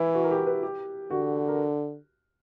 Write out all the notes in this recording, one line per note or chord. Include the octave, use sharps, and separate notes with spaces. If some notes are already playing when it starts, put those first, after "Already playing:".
Already playing: E3 E4
F#4
A#4
G4
B4
G4
D3 F#4
A#4